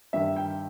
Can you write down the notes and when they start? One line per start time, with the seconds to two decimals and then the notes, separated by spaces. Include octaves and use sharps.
0.13 G2 D#3 E5
0.36 G5